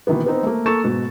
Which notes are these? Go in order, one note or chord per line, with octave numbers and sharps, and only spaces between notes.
B2 D#3 E3 A#3 B3
B3 C4 D#4 C5
A3 A#3
A#3 A4 C#6 A6 E7
G#2 B2